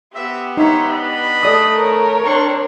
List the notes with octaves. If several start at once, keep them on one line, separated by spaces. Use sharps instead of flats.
B3 C4 G4 E5
D#4 C5 C#5 E5 A#5
D4 D#5 B5
A3 A4 D5 D#6
A#4 C#5
G3 C4 D4 C#6